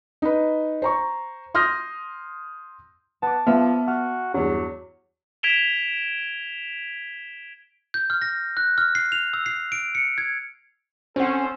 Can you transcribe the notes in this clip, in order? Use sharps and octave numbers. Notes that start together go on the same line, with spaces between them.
D#4 B4
C5 A#5 C#6
C6 D#6 F6 G6 A#6
B3 A5 D6
F3 B3 E5 F6
F#4 F6
E2 G2 F#3
G#6 B6 D7 E7 F7 G7
G6
F6
A#6
F#6
F6
C7
F7
E6
C7
D7
C#7
G#6
C4 C#4 A4 C5 F#5